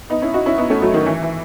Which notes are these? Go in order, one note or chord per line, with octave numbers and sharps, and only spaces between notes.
B3 D#4
C#4 E4
D#4 F#4
C#4 E4
B3 D#4
A3 C#4
F#3 A3
D#3
E3
E3